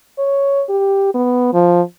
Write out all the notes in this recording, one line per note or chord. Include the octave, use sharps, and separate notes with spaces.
C#5
G4
B3
F3